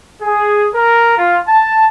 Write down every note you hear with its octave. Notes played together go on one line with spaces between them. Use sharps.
G#4
A#4
F4
A5